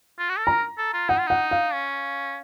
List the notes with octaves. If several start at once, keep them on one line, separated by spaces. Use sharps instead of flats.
F4
F#4
A4
A#4 A#5
A4
F4
D#4 F#5
F4
D#4 F#5
F5
C#4